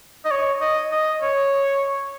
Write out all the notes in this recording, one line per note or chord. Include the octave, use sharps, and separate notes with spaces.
D#5
C#5
D#5
D#5
C#5